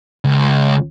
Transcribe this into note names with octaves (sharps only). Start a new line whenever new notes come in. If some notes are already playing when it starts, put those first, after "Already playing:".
C#2